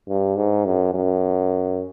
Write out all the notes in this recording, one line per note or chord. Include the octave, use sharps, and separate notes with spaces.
G2
G#2
F#2
F#2